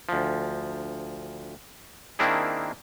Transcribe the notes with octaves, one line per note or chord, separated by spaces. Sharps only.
D2 F3
D#3 A#3 C4 D4 E4 G#4